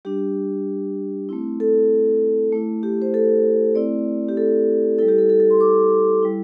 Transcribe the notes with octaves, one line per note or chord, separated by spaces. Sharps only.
G3 D4 G4
A3 C4 E4
A4
A3 E4
G4
C5
A4
A3 C4 E4 D5
G4
A4
G3 E4 A4
G4
A4
A4
A4
C6
D6
G3 E4